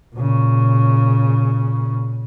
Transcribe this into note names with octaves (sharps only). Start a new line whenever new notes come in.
A#2 C#3